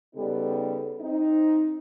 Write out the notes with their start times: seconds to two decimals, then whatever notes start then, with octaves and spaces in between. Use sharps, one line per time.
0.15 C#3 G3 B3 D#4 G4 A4
1.01 C4 D#4